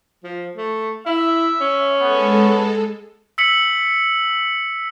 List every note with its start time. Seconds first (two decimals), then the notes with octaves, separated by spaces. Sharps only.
0.24 F3
0.57 A3
1.06 E4 E5
1.61 C#4
2.01 G#3 B3 A4
3.38 E6 B6 C#7 F#7